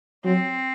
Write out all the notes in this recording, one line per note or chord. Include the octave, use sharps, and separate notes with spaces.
F#3 C4